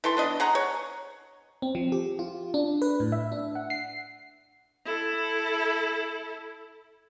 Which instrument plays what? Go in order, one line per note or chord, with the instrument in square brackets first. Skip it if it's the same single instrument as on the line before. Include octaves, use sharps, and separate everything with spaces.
[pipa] E3 A4 C6
B3 D4 D#5
G#4 F#5 A#5
C#5
[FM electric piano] C4
F3
G4
F4
D4
B4
A2
E5
D4
F#5
C7
[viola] E4 A4